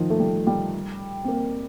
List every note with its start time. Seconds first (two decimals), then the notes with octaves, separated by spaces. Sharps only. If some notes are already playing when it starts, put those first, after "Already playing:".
Already playing: D#3 F3
0.10 A3
0.19 G3
0.47 G3
1.24 C4
1.28 A#3